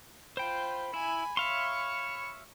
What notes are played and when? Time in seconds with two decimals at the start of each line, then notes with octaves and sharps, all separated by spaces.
0.37 F4 C5 G5 B5
0.94 E4 G#5
1.37 C#5 E5 F5 C6 C#6